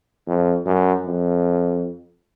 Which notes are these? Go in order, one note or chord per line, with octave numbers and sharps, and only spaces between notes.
F2
F#2
F2